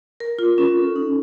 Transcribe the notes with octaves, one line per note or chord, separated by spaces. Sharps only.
A#4
F4
C#4
A4
D#4